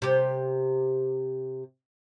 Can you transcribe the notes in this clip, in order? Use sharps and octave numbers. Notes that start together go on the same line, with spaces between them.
C3 G4